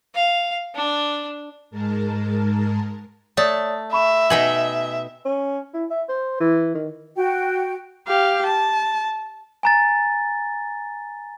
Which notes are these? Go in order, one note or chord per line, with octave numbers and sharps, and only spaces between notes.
F5
D4
G#2 G#3 A#4 A5
A3 C#5 D5 A5 D#6
E5 B5 C#6 E7
B2 D#4 G5 G#5 G#6 F#7
C#4
E4
E5
C5
E3
D#3
F#4 G5
G4 F5
A5
G#5 A#5 A6